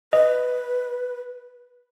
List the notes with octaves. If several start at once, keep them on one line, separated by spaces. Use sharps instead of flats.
B4 D#5